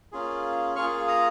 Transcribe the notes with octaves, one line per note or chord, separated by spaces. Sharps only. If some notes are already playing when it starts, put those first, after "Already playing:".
A#3 C#4 F4 G#4
A#3 F4 G#4 C#6 F6
A#5 D#6